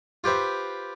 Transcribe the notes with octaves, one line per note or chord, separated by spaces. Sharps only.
F4 G4 B4 C5 E5